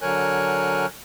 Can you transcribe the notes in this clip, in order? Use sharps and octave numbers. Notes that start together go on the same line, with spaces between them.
D3 F#3 A#4 C#5 G#5 F#6